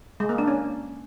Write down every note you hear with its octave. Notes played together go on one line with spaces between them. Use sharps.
G#3
A#3
D4
C#4